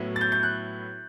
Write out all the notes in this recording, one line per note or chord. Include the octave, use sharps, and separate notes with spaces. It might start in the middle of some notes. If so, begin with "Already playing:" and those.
Already playing: A2 F#3 B3 E4
A6
G6
G6
F#6